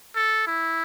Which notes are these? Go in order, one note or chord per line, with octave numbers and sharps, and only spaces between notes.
A4
E4